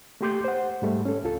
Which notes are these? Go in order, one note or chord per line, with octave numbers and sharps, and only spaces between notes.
A3 A#3 G4 C6 D6 G6
C5 F#5
G#2 G3 A3
C#4 A4
C#2 F4 A4